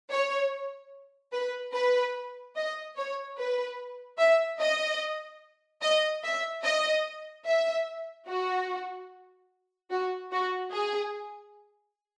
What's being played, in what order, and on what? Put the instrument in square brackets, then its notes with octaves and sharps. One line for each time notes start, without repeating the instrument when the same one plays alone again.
[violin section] C#5
B4
B4
D#5
C#5
B4
E5
D#5
D#5
E5
D#5
E5
F#4
F#4
F#4
G#4